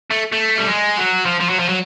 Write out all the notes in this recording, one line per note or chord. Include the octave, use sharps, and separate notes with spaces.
A3
A3
G3
G#3
F#3
F3
F3
F#3
F3
F#3